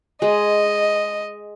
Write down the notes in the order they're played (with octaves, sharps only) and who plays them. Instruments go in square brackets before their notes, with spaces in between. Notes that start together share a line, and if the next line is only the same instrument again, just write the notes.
[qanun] G#3 [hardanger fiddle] D#5